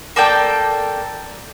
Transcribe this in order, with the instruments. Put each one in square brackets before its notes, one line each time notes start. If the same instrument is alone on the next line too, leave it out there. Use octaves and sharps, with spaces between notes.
[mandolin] A#3 A4 D5 G5